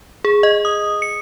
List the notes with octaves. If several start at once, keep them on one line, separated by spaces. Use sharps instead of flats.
G#4
D#5
D#6
C#7